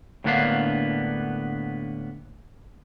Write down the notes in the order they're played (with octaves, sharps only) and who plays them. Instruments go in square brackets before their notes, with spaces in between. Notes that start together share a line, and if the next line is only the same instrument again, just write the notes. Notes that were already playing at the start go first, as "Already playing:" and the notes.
[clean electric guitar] A2 D3 A#3 B3 D4 F5